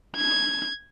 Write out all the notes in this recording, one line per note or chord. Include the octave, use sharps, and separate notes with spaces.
G#6